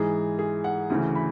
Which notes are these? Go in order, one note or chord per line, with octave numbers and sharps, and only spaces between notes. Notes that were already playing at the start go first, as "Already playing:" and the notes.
Already playing: G#2 E3 G#4
G#4
F#5
D2 C#3 E3
B5